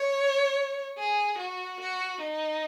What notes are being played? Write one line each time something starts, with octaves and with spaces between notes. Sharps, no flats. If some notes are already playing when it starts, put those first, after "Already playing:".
Already playing: C#5
G#4
F#4
F#4
D#4